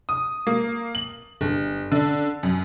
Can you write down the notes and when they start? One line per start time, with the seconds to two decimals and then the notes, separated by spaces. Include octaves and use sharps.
0.09 D#6
0.47 A#3
0.95 F#7
1.41 G1
1.91 D3
2.43 F#2